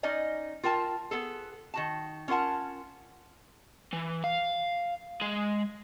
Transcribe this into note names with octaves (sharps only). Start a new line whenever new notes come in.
C#4 D#4 D5 D#5 G#5
F4 A#4 G5 A5
B3 G#4 A4
D#3 F#4 A5
C#4 F4 A#4 F#5 A5
E3
F5
G#3